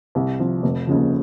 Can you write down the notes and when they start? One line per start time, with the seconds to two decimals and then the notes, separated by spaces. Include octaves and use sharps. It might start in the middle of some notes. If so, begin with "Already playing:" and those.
0.15 C2
0.39 C3 F3
0.63 F1
0.87 D#2 C#3 F3